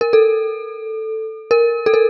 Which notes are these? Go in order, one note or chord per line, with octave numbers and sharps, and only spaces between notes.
A#4
A4
A#4
A4
A#4